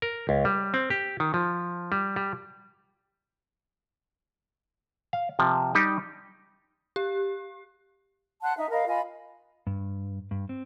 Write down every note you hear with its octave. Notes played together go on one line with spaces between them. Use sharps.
A#4
C#2
G3
C4
G4
D#3
F3
G3
G3
F5
C3 F3
G3 D#4 G4 D#5
G4
F#5 A5 C6 F#6
D#4 E5
A#4 D#5 F5 B5
F4 D#5 G#5 B5
G2
G2
C4